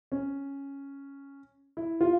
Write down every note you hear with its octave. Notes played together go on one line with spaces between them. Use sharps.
C#4
E4
F4